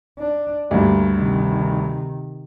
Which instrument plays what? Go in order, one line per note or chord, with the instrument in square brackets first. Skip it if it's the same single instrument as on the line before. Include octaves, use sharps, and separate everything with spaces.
[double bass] D4
[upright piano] D2 G2 [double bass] A#3
[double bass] C3 D#3